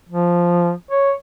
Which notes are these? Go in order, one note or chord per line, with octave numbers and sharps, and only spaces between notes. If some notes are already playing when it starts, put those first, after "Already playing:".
F3
C#5